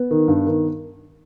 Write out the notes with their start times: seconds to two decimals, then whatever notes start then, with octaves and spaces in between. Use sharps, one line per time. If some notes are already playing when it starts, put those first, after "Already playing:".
Already playing: B3
0.11 D#3
0.28 G2
0.47 D#3